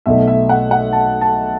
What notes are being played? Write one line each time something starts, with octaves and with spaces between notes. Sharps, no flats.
B1 B2 A3 E5
E5
F#5
F#5
A5
A5